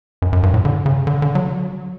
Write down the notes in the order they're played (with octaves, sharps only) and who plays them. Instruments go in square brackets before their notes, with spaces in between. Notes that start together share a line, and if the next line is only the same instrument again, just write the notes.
[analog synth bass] F#2
F#2
G2
A2
D3
C#3
D3
D3
F#3